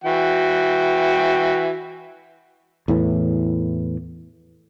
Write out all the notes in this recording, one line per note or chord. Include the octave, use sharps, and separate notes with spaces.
E3 F#4 G5
E2 A2 E3